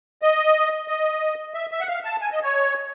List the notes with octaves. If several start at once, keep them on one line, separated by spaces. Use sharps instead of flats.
D#5
D#5
E5
E5
F#5
F5
A5
G#5
D#5
C#5